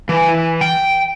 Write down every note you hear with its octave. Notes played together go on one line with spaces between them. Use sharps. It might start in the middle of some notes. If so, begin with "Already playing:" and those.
E3
G5